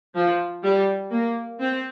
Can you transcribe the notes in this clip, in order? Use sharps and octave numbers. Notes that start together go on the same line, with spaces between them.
F3
G3
A#3
C4